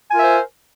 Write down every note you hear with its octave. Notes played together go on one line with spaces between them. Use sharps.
F4 A#4 C5 E5 G#5